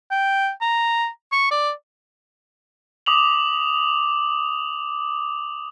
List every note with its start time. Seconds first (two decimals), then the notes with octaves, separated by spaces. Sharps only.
0.11 G5
0.61 A#5
1.32 C#6
1.51 D5
3.06 D6 D#6 F7 F#7